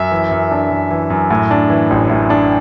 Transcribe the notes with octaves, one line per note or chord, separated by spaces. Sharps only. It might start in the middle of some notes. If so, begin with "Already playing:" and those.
Already playing: F#2 E5
E3
F#2
D4
F#2
E3
F#2
A2
D4
E3
A1
A2
D4